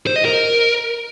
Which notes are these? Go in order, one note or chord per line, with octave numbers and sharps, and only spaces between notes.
C5
D#5
A#4